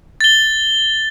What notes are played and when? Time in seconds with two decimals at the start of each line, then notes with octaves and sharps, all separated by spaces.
0.21 A6 G7